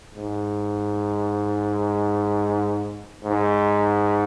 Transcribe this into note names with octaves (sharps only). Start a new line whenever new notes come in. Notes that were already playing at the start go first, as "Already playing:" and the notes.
G#2
G#2